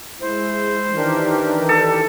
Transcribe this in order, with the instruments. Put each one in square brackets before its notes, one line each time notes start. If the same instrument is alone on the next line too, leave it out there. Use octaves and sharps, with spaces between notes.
[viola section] G#3 E4 [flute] C5
[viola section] D#3 E3 [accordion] D4 G4 A#4
[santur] A4